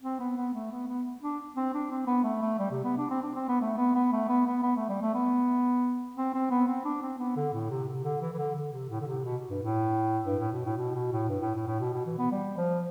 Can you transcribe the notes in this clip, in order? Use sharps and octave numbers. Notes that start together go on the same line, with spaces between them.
C4
B3
B3
A3
B3
B3
D4
C4
D4
C4
B3
A3
A3
G3
C3
B3
D4
C4
D4
C4
B3
A3
B3
B3
A3
B3
B3
B3
A3
G3
A3
B3
C4
C4
B3
C4
D4
C4
B3
D3
A2
C3
C3
D3
E3
E3
D3
D3
C3
A2
D3
C3
B2
G2
A2
G2
A2
B2
A2
B2
B2
A2
G2
A2
A2
A2
B2
B2
E3
B3
G3
F3